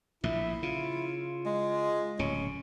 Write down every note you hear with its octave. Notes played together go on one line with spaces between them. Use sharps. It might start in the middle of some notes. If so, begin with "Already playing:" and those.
A#1 A2 E4 E5
C#3 F4
G#3
D1 C#3 C#4